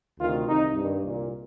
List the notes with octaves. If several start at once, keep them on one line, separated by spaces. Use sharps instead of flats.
D2 C3 D#3 F4
C2 C3 D#3 D#4
G2 D#3
C2 A#2